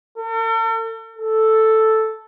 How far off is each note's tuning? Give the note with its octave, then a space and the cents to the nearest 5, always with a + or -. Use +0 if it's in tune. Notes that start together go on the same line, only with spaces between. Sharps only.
A4 +45
A4 +0